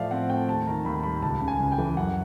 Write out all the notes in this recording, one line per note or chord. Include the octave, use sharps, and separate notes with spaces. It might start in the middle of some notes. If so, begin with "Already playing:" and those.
Already playing: A2 F3 D5 E5 F5
C4 F#5
A3 G5
D#2 A5
D#3 A#5
D#2 B5
G3 B5
C#2 A5
C#3
G#5
C#2
G5
E3
F#2 F#5